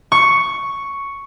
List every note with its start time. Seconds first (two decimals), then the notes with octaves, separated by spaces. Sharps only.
0.12 C#6